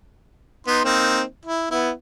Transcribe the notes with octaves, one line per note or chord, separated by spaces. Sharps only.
B3 D#4 C6
A#3 C4 D#4
E4
B3 E4